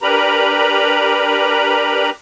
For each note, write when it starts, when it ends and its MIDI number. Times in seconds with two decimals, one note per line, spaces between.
0.02 2.10 62
0.02 2.10 67
0.02 2.10 70
0.02 2.10 71
0.02 2.10 82
0.02 2.10 83